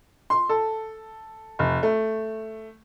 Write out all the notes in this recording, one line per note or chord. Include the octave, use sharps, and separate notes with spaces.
C6
A4
F1
A3